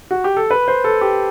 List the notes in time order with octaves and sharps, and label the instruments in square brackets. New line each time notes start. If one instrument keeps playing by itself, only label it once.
[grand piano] F#4
G4
A4
B4
C5
A4
G4